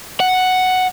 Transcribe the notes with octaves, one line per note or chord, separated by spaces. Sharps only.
F#5